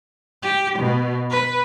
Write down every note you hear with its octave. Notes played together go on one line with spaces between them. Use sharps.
G4
B2
B4